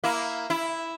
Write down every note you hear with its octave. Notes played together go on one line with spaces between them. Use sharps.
A#3 E4
E4